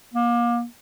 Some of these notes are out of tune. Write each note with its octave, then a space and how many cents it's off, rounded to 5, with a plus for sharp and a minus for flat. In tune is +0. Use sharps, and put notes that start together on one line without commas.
A#3 +30